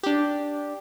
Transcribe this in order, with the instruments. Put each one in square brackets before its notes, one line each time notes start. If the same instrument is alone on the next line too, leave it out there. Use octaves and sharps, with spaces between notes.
[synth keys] D4 G4